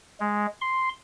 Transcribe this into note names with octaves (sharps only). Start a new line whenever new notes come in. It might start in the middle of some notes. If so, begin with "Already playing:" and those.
G#3
C6